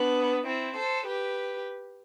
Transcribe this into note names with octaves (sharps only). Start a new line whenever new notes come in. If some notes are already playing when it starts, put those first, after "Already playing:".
Already playing: B3 D4
C4 E4
A4 C5
G4 B4